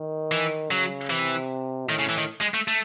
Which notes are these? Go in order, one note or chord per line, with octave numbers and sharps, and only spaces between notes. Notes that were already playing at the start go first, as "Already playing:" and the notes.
Already playing: D#3
E3
C#3 F#3
C3 E3
A2 D#3
C#3
E3
D#3
G#3
A3
A3